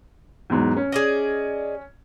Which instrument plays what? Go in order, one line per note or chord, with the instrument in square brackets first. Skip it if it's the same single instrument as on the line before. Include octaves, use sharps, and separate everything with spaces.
[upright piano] E2 G#2 F#3
C#4
[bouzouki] G#4 D5 D#5